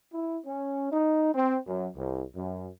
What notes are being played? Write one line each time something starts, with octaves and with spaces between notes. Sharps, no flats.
E4
C#4
D#4
C4
F#2
C2
F#2